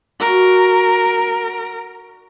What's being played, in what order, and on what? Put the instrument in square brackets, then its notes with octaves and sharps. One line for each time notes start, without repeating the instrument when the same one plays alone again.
[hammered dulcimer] F#4 D5 [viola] A#4